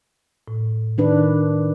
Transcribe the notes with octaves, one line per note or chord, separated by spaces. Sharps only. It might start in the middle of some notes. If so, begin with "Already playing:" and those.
A2
D#3 D4 D#4 B4